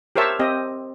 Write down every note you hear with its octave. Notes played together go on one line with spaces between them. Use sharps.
G4 A#4 C5 C#5 E5 A5
C4 G4 D#5